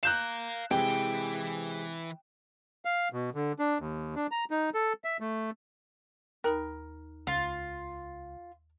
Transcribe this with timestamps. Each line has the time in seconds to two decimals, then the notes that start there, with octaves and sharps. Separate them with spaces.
0.03 F5 A#5 F#6 G6 E7
0.71 C3 E3 G#3 C4 E4 G5
2.85 F5
3.13 B2
3.35 D3
3.59 D4
3.79 D#2
4.15 D4
4.31 A#5
4.51 D#4
4.74 A4
5.04 E5
5.20 A3
6.44 D#2 D#4 A#4 B5
7.27 C#2 F4